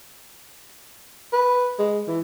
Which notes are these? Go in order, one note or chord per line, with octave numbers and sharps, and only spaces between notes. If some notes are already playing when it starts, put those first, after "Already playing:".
B4
G#3
E3